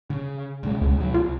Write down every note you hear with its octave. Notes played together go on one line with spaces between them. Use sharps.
C#3
B1 C#3 G#3
D2
B2 F#3
C2 F4